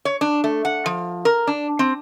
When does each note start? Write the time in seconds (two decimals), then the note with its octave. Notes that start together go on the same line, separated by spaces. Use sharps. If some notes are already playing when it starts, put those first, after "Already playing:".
0.05 C#5
0.21 D4
0.44 A3
0.65 F#5
0.86 F3
1.25 A#4
1.47 D4
1.79 C4